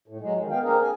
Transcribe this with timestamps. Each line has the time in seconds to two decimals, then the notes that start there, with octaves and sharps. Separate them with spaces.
0.08 A2
0.21 F#3 G#3
0.37 D#3
0.50 B3 F5 G5
0.63 A#3 C4 D4 G#4 A#4
0.82 G#5